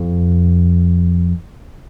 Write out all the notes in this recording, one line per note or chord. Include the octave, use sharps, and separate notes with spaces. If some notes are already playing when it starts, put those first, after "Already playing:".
Already playing: F2